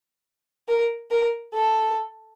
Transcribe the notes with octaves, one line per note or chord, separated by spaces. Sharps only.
A#4
A#4
A4